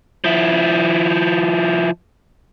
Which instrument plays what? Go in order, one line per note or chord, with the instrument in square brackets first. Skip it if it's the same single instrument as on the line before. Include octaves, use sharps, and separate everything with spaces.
[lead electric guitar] F3 E4